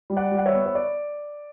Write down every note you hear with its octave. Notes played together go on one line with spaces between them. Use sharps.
G3
D5 F#5
G3
F#5
C#5 E5
B3
C#5
D5